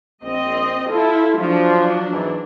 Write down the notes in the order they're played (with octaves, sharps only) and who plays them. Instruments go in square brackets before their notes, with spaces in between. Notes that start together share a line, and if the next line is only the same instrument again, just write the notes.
[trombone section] A#1 [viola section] C4 D#5
[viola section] E4 F4 [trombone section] A4
[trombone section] F3 [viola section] F#3 D4
[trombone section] E2 G#2 E3